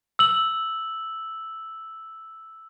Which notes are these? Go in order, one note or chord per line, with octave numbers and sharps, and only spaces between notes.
E6 F#7